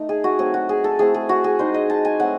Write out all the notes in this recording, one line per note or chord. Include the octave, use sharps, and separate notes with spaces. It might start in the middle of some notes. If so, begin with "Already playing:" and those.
Already playing: A3 D#4
G#4
F#4
F#3 A3 C4 G#4
F#4
G#4
A4
A3 C4 E4 G#4
G#4
F#4
G#4
G#3 D#4 C5
D#5
A5
G#5
F#3 A3 C4 F#5